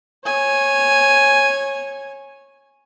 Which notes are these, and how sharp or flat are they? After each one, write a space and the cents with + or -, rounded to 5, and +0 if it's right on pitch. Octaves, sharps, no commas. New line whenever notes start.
C#5 -15 G#5 +0